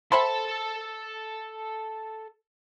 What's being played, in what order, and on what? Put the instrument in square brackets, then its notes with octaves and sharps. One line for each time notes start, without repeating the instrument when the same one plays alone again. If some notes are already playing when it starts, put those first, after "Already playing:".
[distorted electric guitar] A4 A5 [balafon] C5 G5 [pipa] E5 B5 C6